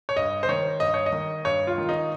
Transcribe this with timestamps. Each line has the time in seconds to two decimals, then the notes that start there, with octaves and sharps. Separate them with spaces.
0.09 C#5
0.16 G2 D#5
0.43 C5
0.49 D#3 C#5
0.80 G2 D#5
0.94 C#5
1.06 D#5
1.12 D#3
1.45 G2 C#5
1.67 F4
1.78 D#3
1.89 D#4